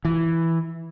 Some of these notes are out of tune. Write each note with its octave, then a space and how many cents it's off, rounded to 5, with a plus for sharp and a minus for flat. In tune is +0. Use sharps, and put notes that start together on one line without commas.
E3 +0